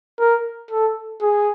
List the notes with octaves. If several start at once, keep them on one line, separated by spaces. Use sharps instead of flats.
A#4
A4
G#4